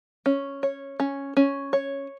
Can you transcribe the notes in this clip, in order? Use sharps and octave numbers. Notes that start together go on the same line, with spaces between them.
C#4
C#5
C#4
C#4
C#5